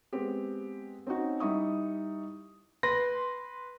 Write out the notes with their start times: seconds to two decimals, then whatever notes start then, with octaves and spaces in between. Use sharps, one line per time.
0.13 G#3 B3 C4 G4
1.07 C4 C#4 D#4 F#4
1.40 G3 D#4 E4 C#6 D#6
2.83 B4 C6 A#6